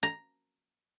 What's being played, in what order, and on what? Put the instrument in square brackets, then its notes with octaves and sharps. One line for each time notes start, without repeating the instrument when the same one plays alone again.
[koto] A#5